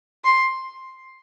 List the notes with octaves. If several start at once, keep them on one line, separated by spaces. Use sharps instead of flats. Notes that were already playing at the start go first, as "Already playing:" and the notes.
C6